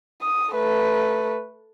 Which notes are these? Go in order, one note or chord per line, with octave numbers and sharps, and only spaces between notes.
D#6
A3 B4